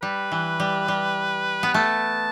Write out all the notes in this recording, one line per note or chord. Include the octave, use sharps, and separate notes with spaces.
G3 B4
E3
G3
G3
B3
A3 A5